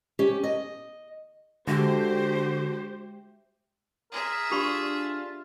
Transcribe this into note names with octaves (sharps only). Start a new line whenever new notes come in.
C#4 G4
D#5
D3 G#3 F#4 G4 C5 E5 G5
G#4 A#4 E5
D4 F4 G4 B5 C#6